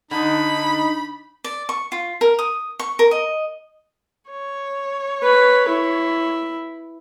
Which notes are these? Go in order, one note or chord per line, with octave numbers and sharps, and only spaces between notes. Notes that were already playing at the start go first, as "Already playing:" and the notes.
D3 D#4 B5
D5
C#6
F4
A#4
D#6
C#6
A#4
D#5
C#5
B4
E4